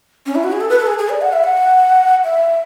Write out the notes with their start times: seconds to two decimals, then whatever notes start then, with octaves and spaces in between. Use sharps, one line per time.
0.26 C#4
0.35 E4
0.44 F#4
0.52 G#4
0.61 A4
0.70 B4
0.79 A4
0.87 G#4
0.98 G#4
1.09 D5
1.21 F#5
1.33 E5
1.44 F#5
2.24 E5